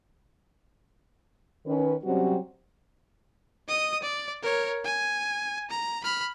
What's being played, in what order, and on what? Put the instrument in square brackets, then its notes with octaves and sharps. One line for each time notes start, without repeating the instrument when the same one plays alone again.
[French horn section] D#3 C#4 B4
C3 F#3 G3 C4 C#4 F#4
[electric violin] D#5 D#6
D5
A#4 C#5
G#5
A#5
B5 F6